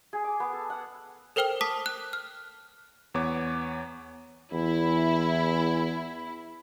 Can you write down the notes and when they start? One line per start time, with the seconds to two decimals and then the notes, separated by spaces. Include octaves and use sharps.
0.13 G#4
0.24 D6
0.40 B3
0.53 A4
0.70 F#5
1.36 A4 A#4 C5 G5 F6 G7
1.61 A5 D6 D#6 B6
1.86 F#6
2.13 F6
3.14 E2 B3 C#5 D6
4.53 E2 E4